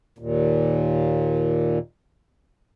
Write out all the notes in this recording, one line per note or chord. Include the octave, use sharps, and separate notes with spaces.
D#2 A#2